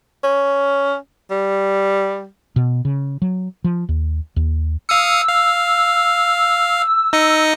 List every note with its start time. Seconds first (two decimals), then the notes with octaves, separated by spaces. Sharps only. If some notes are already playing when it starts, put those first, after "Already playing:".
0.24 C#4
1.30 G3
2.56 B2
2.85 C#3
3.22 F#3
3.64 F3
3.89 D#2
4.36 D#2
4.89 F5 D#6 E6 C#7
5.29 F5
7.13 D#4 D#5 C#7